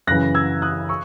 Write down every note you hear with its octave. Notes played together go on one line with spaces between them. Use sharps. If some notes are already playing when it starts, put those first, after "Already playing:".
F#2 C#3 E3 F#6 A#6
E6 G#6
D#6 F#6
C#6 E6